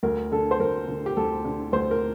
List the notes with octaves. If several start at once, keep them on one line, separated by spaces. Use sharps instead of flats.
D2 A#4
D3 A4
C5
D2 A#4
D3
G4
D2 A4
D3
D2 C5
A#4